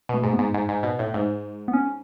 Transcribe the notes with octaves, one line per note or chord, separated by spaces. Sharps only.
B2 A3
G#2
B3
G#2
G#2
G#2
B2
A2
G#2
B3
C#4